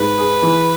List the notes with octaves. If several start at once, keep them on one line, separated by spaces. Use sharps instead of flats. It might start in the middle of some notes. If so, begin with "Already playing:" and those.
Already playing: G#2 B4
G#4
E3